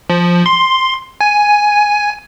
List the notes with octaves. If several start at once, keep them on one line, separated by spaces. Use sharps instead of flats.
F3
C6
G#5